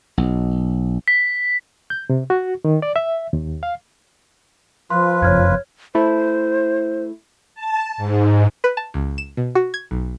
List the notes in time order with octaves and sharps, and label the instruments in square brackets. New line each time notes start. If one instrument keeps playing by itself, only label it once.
[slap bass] B1
[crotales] B6
[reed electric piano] G6
C3
F#4
D#3
D5
E5
D#2
F5
[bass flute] F3 [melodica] F4 B4 [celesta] C6
[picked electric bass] F#1 F2 [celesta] C#5 F6 G#6
[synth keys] A3 E4 [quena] C5
[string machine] A5
G#2
[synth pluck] B4
A5
C#2
E7
B2
F#4
G#6
B1